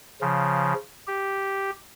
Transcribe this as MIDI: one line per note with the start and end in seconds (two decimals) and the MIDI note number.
0.21 0.74 49
0.21 0.74 53
1.07 1.71 67